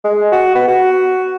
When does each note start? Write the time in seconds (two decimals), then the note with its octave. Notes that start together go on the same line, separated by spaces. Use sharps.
0.04 G#3
0.32 F#4
0.55 B3
0.68 F#4